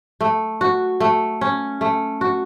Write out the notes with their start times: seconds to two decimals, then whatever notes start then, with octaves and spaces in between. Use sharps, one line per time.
0.21 A3
0.61 F#4
1.00 A3
1.41 C#4
1.81 A3
2.21 F#4